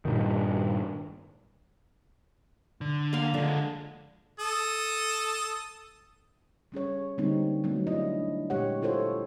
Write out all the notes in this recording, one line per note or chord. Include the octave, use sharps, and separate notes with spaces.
G2 A#2 D#3
D3
A#3 F5 C6
D3 F3 G#3
A4 D#6
G3 C#4 G#4 C#5
D3 G3 G#3 A#3 C4 D#4
F#3 A3 B3 C4
D4 E4 D#5
A#2 G#3 G4 C#5 F#5
E4 F4 A4 C5 C#5